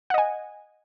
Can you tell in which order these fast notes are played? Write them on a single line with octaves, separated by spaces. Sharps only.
F#5 D#5 G#5